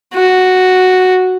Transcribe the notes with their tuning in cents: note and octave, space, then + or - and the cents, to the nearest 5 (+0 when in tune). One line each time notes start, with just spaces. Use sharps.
F#4 +0